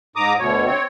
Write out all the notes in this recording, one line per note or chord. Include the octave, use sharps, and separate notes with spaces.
G#2 A#5 D6 D#6
D2 B2 C#5
C4 C#5